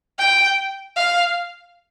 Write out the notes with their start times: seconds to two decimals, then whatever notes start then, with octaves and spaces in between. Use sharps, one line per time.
0.18 G5
0.96 F5